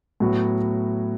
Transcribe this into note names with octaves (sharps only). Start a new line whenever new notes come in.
A2 F#3 B3 F#4